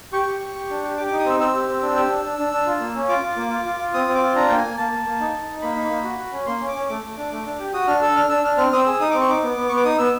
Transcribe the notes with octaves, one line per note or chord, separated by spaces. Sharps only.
G4 C#6
G4
G4
G4
D4
G4
G4 D6
D6
D#4
D#6
C4 E6
C4 E6
G4
C4
D4
G4
D4
D4
D4
D4
F4
A#3
C#4
F4 D6
F4
A#3
F4
F4
F4
C4 D#6
C4
D6
F4
D4 A#5
A#3 G5
G#5
A#3
A#3 A5
A#3
A#3
D#4
D#4
D#4
A#3 B5
D#4
A#3
F#4
F#4
C#4
A#3 C6
C#4
D6
C#4
A3 D6
A3
D4
A3
D4
G4
F#4 D#6
D4 F6
A4 E6
D4 F6
D4 E6
D4 F6
C4 F6
C4 D#6
E6
G#4
D#4 D#6
C4 D6
C#6
D#4 D6
B3
B3
B3 C#6
D6
D#4 D#6
B3 E6